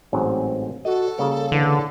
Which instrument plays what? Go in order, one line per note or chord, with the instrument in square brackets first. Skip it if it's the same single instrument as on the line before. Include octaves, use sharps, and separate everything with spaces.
[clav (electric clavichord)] A1 G#2 F#3 [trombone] C4
[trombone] F#4 [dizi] A4 [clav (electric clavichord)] D#5
[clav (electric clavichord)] C#3 A#3 A#4 [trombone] G3
[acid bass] D3 [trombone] E3